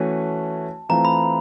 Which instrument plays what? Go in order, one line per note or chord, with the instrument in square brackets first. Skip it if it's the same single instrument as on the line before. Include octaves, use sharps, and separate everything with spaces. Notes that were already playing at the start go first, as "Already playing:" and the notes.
Already playing: [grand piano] E3 A3 C#4 F#4 [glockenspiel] A5
[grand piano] E3 A3 C4 F4 [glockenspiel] A#5
[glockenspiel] B5